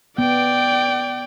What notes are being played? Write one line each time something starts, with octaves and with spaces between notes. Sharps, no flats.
B3 D5 G5